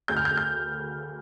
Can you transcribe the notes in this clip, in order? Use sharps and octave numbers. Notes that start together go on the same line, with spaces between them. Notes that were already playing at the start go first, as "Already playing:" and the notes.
D2 G6
F6
G6
D2
G6